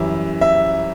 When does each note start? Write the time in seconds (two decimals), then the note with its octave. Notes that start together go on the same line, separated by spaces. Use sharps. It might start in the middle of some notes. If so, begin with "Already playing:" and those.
Already playing: F#2 E3 G3 E5
0.41 E5